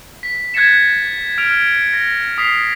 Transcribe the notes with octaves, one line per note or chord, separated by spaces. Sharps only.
B6
F#6 G#6 A6 B6 C#7 E7
F6 D7 F7
A#6
D#6 B6 C7